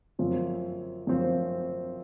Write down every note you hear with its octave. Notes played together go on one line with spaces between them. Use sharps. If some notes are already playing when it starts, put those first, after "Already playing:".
F#2 F3 C4 F4 C5
F#2 F3 C4 F4 C5